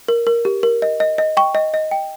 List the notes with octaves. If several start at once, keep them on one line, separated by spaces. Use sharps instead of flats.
A#4
A#4
G4
A#4
D#5
D#5
D#5
G5 C#6
D#5
D#5
G5